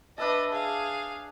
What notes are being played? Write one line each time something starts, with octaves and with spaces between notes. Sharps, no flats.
D4 B4 D#5 E5 A5
G#4 F5